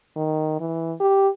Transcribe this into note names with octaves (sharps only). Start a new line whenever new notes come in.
D#3
E3
G4